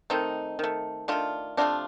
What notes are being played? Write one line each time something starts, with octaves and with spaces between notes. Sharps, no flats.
D#3 A3 C4 D#4
D#3 A3
D#3 A3 D4 F4
C3 F3 A3 D4 F4